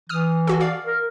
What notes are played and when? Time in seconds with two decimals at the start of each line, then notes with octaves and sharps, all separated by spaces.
0.09 E3 D#6 F6
0.47 F#4 A4
0.60 D5 F5
0.86 A#4